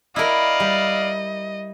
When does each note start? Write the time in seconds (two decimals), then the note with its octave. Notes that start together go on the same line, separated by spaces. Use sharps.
0.16 E4 A#4 D5 D#5 F5
0.60 G3